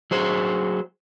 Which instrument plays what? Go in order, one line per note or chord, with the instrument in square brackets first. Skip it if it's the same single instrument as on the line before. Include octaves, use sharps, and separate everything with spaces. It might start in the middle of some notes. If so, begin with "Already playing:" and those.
[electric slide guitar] F#3 G#4 C5